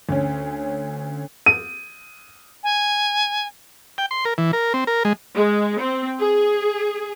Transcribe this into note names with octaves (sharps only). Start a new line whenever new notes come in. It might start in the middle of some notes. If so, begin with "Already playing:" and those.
D2 C#4
D#7
G#5
G5
C6
A#4
E3
A#4
C4
A#4
G#3
G#3
C4
G#4